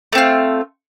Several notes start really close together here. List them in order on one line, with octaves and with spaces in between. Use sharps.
A3 C4 F4